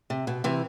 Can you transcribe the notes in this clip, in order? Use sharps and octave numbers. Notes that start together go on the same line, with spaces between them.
C3
B2
C3 E3